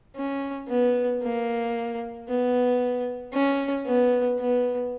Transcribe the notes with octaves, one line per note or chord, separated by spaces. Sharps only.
C#4
B3
A#3
B3
C#4
B3
B3